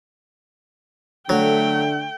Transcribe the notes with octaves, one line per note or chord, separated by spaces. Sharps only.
D3 F#3 A3 G5